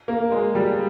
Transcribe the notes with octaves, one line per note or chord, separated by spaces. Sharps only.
A#3
G#3
G3